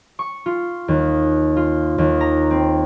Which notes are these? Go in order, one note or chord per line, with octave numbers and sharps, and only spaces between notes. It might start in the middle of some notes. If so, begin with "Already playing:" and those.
C#6
F4
D#2
F4
D#2
A#5
C4